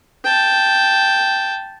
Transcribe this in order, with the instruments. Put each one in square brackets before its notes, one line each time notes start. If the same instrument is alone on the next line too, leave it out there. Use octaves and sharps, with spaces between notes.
[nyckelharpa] G5 A5